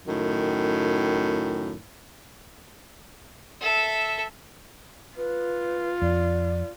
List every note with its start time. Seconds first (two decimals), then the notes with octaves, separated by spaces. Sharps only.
0.07 F#2 A2 D#3
3.61 A4 E5
5.17 F4 B4
6.02 F2 D5